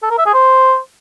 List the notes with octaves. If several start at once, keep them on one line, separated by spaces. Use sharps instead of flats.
A4
A#4
E5
G#4
C5